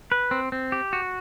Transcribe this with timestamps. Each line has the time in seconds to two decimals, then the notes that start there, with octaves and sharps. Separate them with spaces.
0.12 B4
0.31 C4
0.52 C4
0.72 G4
0.93 F#4